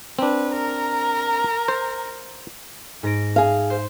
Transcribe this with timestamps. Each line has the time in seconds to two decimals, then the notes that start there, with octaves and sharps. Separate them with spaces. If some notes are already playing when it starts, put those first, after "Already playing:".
0.19 C4 D4 B4
0.53 A#4 A#5
1.68 C5
3.03 G#2 A#6 D7
3.36 G#4 F5
3.70 C5